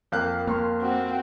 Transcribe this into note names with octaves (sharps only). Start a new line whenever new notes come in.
F2 A#3 F5 G5 F#6
A#3 C6 C#6 F6
C4 F#4